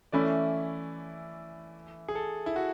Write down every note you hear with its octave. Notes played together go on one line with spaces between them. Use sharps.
E3 A3 C#4 E4 D5
G#4
A4
E4
F#4